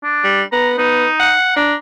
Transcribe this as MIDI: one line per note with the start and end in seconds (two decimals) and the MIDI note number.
0.04 0.41 62
0.24 0.43 55
0.52 0.77 59
0.52 0.69 82
0.78 1.06 59
0.78 1.33 63
1.20 1.52 78
1.56 1.74 62
1.56 1.76 82